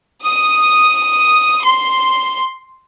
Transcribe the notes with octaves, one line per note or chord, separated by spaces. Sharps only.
D#6
C6